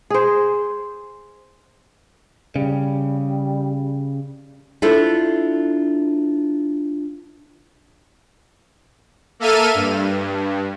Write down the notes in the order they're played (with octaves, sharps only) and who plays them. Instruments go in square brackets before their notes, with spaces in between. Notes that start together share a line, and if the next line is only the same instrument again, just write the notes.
[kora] G#4 C5
[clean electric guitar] C#3 [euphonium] G3
[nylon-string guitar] D4 E4 F4 A4 C5
[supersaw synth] A#3 A4 E5 F6 D#7
G2